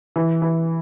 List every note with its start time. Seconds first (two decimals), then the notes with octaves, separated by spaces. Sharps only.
0.16 E3
0.42 E3